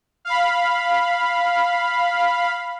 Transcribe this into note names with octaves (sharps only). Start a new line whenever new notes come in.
F5 B5